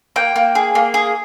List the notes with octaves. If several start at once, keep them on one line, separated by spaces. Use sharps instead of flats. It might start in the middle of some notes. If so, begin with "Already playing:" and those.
A#3 G5
A#3
G#4
A#3
G#4